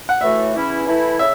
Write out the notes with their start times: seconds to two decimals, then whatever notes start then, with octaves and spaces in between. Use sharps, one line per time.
0.09 F#5
0.21 A2 E3 A3 F#4 E5
0.54 E2 E3 C#4 E4
0.86 E3 A3 E4
1.19 C#3 E5